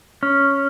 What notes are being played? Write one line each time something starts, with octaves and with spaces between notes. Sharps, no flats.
C#4